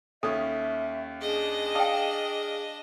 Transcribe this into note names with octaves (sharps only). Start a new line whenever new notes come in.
D#2 C#4 A4 E5
D4 G#4 D#5
D5 F5 G5 A5 D#6